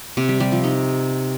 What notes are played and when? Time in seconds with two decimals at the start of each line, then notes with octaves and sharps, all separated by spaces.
0.17 C3
0.29 G3
0.40 G3
0.52 F3
0.64 D#4